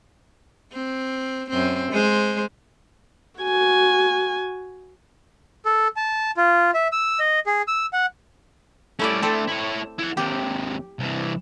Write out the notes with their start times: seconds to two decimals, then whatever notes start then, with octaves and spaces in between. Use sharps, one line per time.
0.73 C4
1.50 F#2 C4
1.92 G#3 C5
3.41 F#4 G#5
5.66 A4
5.97 A5
6.37 F4
6.74 E5
6.92 E6
7.20 D#5
7.46 G#4
7.68 E6
7.93 F#5
8.99 G3 A3 C#4 E4 D5
9.22 A3 C4 D4 A4
9.48 E4 C#5
9.99 E4 F#5
10.17 D#2 C3 G4
10.99 C2 E3